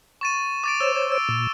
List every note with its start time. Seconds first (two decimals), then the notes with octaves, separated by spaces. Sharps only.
0.21 C#6 A6 D#7
0.64 D6 A6 D7
0.80 C5 C#5 E6 E7
1.12 E6 D7
1.29 A#2